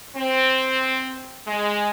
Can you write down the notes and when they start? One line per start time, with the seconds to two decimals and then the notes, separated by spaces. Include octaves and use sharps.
0.16 C4
1.47 G#3